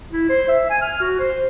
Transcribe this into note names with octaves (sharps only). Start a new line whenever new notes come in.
E4
C5
E5
G#5
F6
F#4
C5